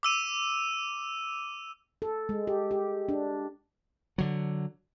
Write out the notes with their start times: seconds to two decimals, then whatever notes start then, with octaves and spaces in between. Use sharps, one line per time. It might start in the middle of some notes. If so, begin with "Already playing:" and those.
0.03 D6 E6 D#7
2.02 A4
2.29 G#3
2.47 G4
2.71 G4
3.09 D4
4.18 D3 F#3